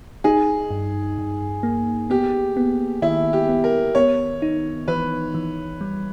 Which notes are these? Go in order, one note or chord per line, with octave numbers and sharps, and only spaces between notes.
D#4 G#4
G2
G2
A#3
B3 G4
B3
D#3 E4
G4
B3
A#4
B3 C#5
D#4
E3 B4
E3
G3